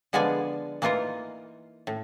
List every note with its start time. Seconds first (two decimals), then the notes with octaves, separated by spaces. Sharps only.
0.13 D3 F3 G#3 B3 D5 G#5
0.82 E3 A#3 D#4 F4 A#4
1.87 A2